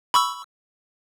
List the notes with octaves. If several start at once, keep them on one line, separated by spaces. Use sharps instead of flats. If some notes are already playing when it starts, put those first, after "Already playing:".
B5 C#6 E6